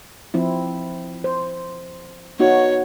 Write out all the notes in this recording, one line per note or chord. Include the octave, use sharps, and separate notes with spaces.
F3 C4 E4
C5
B3 D#4 F#4 C#5